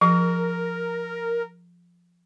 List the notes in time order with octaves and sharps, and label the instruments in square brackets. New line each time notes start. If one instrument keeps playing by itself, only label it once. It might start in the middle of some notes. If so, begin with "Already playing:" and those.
[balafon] F3 [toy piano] G#4 [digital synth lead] A#4